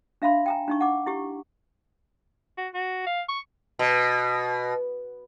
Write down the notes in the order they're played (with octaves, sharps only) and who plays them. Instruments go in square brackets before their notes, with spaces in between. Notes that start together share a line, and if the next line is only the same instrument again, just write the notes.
[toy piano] D4 E5 F5 B5 C6
G5 G#5 A#5
D4 D#4 C#6
F#5 D6
E4 G4 C#6
[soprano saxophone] F#4
F#4
F5
C#6
[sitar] B2